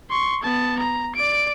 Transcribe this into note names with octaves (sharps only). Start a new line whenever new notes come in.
C6 C#6
B3 A5
A#5
D5 D7